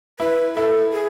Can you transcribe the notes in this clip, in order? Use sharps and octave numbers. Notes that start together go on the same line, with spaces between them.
E4 B4
E4 A4
G#4